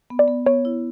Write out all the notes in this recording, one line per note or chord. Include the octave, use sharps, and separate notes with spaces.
B3
D5
B3
B3 C#5
E4